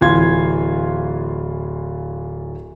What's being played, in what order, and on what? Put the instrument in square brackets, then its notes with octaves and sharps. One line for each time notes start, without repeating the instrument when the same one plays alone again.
[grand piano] D1 E3 F4 F5 C6 G#6